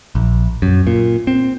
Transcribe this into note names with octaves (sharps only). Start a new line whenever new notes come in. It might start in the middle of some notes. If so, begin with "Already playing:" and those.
A#1
F#2
A#2
C4